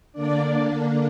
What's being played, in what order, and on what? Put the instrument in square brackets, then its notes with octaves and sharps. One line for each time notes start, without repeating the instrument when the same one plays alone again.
[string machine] D3 A#3 D4 D5